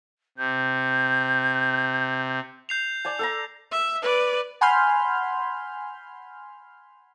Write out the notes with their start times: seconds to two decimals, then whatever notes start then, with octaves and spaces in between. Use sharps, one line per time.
0.38 C3 G6
2.69 G6 C7 F7
3.05 D5 G#5 A5
3.19 A4 A5 A#5
3.72 E5
4.02 B4 D5
4.61 F#5 G#5 B5 C6 F6 G6